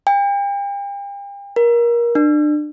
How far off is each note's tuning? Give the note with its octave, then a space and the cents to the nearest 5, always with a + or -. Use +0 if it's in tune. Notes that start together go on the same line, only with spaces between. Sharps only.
G5 +40
A#4 +25
D4 +30